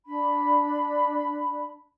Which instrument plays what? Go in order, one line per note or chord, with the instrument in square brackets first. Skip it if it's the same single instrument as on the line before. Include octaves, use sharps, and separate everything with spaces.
[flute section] D4 B5